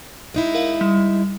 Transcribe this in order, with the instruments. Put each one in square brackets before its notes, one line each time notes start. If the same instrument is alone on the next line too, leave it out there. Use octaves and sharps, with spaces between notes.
[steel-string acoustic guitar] G#3 D#4 E4
[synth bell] A#4 F5
G3